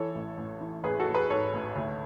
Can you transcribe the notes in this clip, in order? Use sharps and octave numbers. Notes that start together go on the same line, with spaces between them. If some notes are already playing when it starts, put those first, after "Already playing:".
Already playing: E3 A4 C#5
A1
A1
E3
A1 G#4 B4
F#4 A4
A1
G#4 B4
G#2 A4 C#5
A1
D2